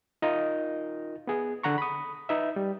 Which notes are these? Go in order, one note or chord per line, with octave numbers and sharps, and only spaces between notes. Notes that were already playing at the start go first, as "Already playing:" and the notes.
D#4 F4 A#4 D#5
B3 G#4
D3 F#5 A#5 C#6
B5 D#6
D#4 B4 E5
G3